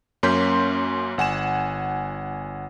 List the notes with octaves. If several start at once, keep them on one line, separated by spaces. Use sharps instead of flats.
F#2 A#3 C#4 C6 G6 B6
G1 F#5 G#5 E7